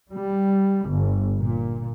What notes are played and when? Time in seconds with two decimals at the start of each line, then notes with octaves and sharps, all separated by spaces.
0.11 G3
0.89 G1
1.39 A#2